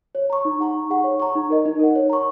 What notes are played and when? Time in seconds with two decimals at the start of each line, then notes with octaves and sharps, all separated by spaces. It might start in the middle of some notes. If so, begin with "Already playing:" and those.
0.15 C#5
0.30 A#5 C#6
0.45 D#4
0.60 G#4 F#5 A#5 C#6
0.74 D#4
0.90 G#4 F#5 C#6
1.04 C#5
1.20 A#5 C#6
1.35 D#4
1.50 A#4 D#5
1.65 D#4
1.79 A#4 F#5
1.96 C#5
2.10 A#5 C#6